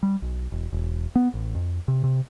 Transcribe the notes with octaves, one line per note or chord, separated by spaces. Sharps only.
G3
B1
E1
E1
B3
A1
F2
C3
C3